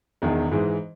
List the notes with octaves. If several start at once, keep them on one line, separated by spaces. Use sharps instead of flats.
E1 E2 D#3
G#2 E3 G#3